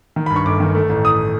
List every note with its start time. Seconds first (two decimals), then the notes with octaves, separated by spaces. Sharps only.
0.16 D#3
0.26 B5
0.30 G2
0.36 C#6
0.46 G1 D6
0.60 D#3
0.75 A3
0.89 A1
1.03 E3 D#6